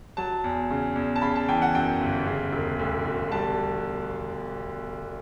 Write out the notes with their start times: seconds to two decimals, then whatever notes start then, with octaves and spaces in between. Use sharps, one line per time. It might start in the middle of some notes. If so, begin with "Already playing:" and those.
0.17 F#3 A5
0.44 E2
0.70 C#3
0.96 E2
1.16 A5
1.22 C#3 B5
1.36 A5
1.48 E3 G5
1.62 F#5
1.75 F#2 G5
2.01 G1
2.27 C#3
2.52 E1
2.79 D2
3.05 E1
3.31 G3 A5